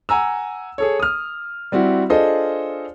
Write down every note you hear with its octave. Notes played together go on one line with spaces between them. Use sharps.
F#5 G#5 A#5 E6
G#4 A4 C#5
D#6 F6
G3 C4 E4 F#4
D4 F4 G#4 A4 C5 D#5